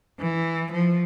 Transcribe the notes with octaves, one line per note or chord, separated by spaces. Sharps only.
E3
F3